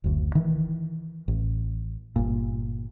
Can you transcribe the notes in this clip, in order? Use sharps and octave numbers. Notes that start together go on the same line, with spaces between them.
F#1 D2
D#3 E3
A1
G1 A#2